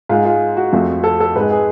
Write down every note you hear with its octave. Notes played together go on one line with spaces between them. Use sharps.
G#2 G#3 F4
F4
F#4
F2 F3 A3
A4
A4
G#2 G#3 B4
G#4